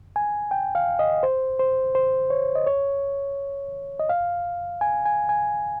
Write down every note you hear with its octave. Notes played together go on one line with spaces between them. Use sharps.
G#5
G5
F5
D#5
C5
C5
C5
C#5
D#5
C#5
D#5
F5
G#5
G#5
G#5